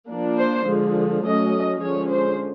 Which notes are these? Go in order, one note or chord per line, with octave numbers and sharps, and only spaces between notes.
F3 A#3 D4
C5
D3 F3 G#3
F#3 A3 C#4 D#5
D3 F3 G#3 C#4 C#5
C5